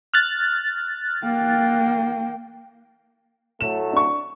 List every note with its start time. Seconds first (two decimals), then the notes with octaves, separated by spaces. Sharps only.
0.14 F6 F#6 A6
1.24 A#3 G5
3.61 A2 F#3 A3 E7
3.93 D4 C#6